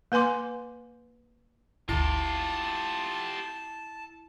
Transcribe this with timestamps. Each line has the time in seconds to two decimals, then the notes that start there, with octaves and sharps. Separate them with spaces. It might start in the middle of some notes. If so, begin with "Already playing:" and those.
0.12 A#3 B4 G#5 C6 D6
1.89 G1 D2 E4 F4 G4 A5